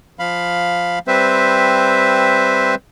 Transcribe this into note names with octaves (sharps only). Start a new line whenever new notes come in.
F3 F5 B5
G3 C4 B4 C5 E5